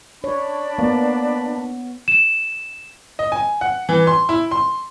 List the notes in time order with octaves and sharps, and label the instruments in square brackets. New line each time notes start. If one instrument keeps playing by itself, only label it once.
[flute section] D4 [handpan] C#5 [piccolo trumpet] B5
[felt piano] A#3 [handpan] B3
[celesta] E7
[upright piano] D#5
G#5
F#5
E3
C6
E4
C6